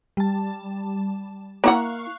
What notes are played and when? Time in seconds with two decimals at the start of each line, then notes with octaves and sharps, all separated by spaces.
0.17 G3 A5
1.64 A#3 E4 F5 F#5 C#6 F#6